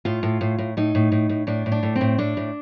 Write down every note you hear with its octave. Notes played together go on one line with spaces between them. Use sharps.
A2 F4
A2
A2
A2
A2 D#4
A2
A2
A2
A2 D4
A2
D4
A2
C4
A2
A2 D4
A2